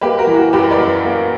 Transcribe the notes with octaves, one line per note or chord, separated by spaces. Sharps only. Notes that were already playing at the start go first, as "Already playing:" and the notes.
A#3 G4 B4
F#4 A#4
E3
F#4
F#2 G4 B4
B4 D5
F#2
A#3